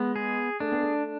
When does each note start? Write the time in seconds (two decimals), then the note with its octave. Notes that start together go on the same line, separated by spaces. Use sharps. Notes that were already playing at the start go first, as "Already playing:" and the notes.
Already playing: G#3 B3
0.16 G#4
0.60 A3 D4
0.72 B3
0.81 A3